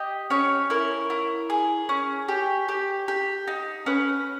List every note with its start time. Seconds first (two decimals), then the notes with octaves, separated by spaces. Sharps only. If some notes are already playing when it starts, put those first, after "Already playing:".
Already playing: G4 D#5
0.30 C#4 C#5
0.70 E4 A#4
1.10 E4
1.50 G#4
1.89 C#4
2.28 G4
2.69 G4
3.08 G4
3.47 D#4
3.86 C#4 B4